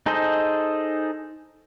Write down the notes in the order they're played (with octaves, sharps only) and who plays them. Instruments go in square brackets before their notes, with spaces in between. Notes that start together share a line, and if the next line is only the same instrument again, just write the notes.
[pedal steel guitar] D#4 G#4 A4 C5 D#5